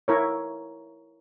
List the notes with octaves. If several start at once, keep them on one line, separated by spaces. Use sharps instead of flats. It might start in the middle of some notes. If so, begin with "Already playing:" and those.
E4 A#4 C#5